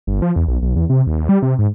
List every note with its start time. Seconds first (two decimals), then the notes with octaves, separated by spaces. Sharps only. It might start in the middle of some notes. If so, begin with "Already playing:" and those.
0.07 G1
0.22 F3
0.36 E2
0.48 B1
0.62 B1
0.76 E2
0.90 C3
1.07 D#2
1.29 G3
1.42 C3
1.59 G#2